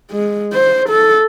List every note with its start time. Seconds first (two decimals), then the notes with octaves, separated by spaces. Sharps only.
0.11 G#3
0.53 C5
0.89 A4